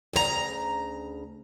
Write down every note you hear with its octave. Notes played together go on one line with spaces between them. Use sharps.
D2 C#3 B4 A#5